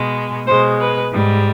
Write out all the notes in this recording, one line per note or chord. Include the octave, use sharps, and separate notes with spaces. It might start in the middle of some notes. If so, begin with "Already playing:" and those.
Already playing: B2 G#3
B2 G#3 C5
B4
G#2 G3